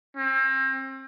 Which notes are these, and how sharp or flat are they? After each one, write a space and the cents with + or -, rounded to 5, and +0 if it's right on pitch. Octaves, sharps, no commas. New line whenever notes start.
C4 +35